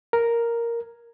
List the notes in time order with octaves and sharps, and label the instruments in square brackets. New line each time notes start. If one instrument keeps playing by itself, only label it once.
[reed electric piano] A#4